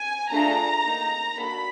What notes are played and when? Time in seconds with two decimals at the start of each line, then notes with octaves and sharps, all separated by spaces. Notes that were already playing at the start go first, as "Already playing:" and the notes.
Already playing: G#5
0.31 A3 D4 F4 G#4 A#5
0.84 A#3 D#4 G#4
1.37 A#3 D4 F#4 A4 B5